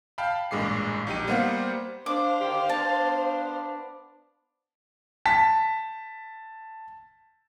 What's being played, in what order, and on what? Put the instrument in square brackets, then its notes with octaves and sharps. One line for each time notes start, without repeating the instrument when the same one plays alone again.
[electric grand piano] F5 G5 A5 B5
A1 G2 A#2 G#3 D6 C7
A#1 D#4 G4 D#7
G3 A#3 B3 C5 F5 F#5
[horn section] D4 [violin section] C5 F5 [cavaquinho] D6
[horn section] D3 D#3 G4
[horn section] B3 D4 [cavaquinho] A5
[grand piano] A5 B6